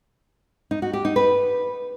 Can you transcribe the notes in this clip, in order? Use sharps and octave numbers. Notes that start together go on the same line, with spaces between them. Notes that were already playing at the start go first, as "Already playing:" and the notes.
D#4
F#4
G4
D#4
B4